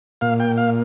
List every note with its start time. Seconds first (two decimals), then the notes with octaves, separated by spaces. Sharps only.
0.21 A#2 F5
0.40 G5
0.58 F5